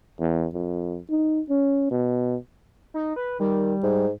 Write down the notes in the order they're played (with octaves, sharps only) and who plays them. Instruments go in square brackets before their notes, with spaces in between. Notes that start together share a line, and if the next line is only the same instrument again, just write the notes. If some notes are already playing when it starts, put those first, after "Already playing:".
[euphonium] E2
F2
D#4
C#4
B2
[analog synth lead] D#4
B4
[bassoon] D#3 [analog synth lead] G3
[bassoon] G#2